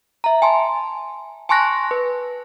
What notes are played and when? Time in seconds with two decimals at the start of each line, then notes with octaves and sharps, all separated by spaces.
0.24 E5 A#5
0.42 G#5 A5 C6
1.49 G#5 A5 C6 C#6 F#6 A#6
1.91 B4